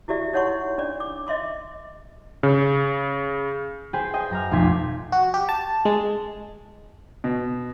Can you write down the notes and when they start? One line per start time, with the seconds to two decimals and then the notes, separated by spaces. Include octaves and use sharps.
0.08 E4 F#4 G4 D5 E5
0.33 D#4 C#5 F#5 C6 C#6
0.78 C#4 D4 D5
1.00 D6
1.27 D#5 E5 C6 D6
2.43 C#3
3.93 G#4 B4 C5 G5
4.14 D#5 G5 G#5
4.30 F#2 A#5 F6
4.51 F1 B1 F2 C6 G#6 B6
5.12 F#4
5.34 G4
5.49 A5
5.85 G#3
7.24 B2